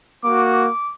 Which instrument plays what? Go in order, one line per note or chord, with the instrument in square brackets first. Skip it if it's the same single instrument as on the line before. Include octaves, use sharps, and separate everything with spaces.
[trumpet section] A#3 F#4 D6
D6